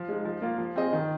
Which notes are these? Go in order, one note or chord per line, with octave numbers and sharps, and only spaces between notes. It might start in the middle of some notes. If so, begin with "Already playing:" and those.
Already playing: F3
G#3 D#4
F3
A#3 F4
F3
C4 G#4 D#5
D#3